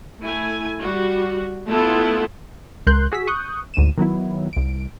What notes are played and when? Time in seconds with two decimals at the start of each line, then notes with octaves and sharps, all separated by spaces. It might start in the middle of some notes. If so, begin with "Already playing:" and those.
0.21 A3 E4 G#5
0.81 G3 F#4
1.68 A3 B3 E4 F4 A4
2.87 C#2 A#4 C6 F#6 G6
3.12 F#4 G#4 E6 B6
3.27 C#6 D#6 F#6 G6
3.74 D2 G#2 D#7 E7
3.98 D#3 F#3 B3 E4
4.53 C2 D7